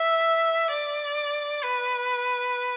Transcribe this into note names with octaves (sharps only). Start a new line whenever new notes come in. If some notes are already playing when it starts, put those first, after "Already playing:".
Already playing: E5
D5
B4